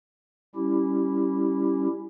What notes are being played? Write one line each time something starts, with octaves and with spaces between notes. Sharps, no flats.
G3 C#4 E4 G4